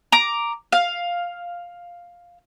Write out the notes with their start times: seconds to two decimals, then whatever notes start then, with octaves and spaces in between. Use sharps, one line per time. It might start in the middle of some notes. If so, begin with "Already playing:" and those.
0.12 A#5 D6
0.72 F5